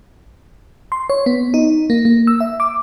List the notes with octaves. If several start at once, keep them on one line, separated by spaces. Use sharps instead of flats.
C6
C#5
B3
D#4
A#3
A#3
E6
E5
D6